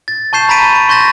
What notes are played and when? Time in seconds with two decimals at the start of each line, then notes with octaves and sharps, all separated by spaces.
0.08 A6
0.33 A5 C#6 G6 C7 E7
0.49 A#5 B5 A6 B6 D7 D#7
0.75 D7
0.89 C6 C#6 G6 A6 A#6 E7